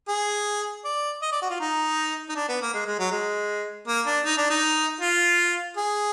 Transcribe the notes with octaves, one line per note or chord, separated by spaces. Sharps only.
G#4
D5
D#5
D5
F#4
F4
D#4
D#4
D4
B3
A#3
G#3
G#3
F#3
G#3
A#3
D4
D#4
D4
D#4
F4
G#4